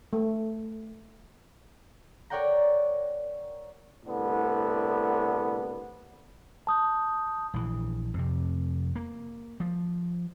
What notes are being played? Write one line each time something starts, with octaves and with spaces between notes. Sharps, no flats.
A3
A#4 C#5 D5 F#5 G5 A#5
C2 A2 D3 B3
A5 D#6 G6
A#1 E3
F2 C3
A#3
F3